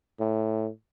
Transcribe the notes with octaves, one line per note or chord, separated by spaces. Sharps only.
A2